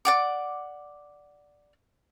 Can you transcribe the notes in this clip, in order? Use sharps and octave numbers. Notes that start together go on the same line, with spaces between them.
D5 F#5 D6